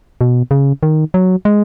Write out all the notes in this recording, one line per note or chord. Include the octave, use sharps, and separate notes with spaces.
B2
C#3
D#3
F#3
G#3